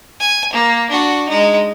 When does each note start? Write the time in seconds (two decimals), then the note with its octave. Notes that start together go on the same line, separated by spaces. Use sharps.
0.20 G#5
0.53 A#3
0.90 D4 F#4
1.29 G#3 D#4